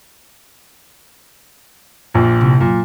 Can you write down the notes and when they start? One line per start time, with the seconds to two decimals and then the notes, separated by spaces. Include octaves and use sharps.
2.14 A#1 A#2
2.41 C3 E4
2.61 A#2 F#3